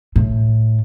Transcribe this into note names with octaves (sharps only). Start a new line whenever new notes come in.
A2